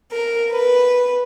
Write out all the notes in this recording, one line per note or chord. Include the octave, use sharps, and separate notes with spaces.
A#4
B4